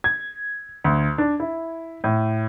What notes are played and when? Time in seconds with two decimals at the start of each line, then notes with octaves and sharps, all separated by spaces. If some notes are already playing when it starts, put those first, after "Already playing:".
0.04 G#6
0.84 D2
1.18 D4
1.40 E4
2.04 A2